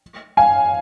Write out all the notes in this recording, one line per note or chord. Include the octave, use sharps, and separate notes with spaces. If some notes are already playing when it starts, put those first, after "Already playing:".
F5 G#5